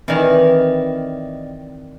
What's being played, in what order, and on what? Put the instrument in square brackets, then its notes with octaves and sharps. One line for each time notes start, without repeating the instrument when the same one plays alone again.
[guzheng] D#3 E3 [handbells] C4 D5 D#5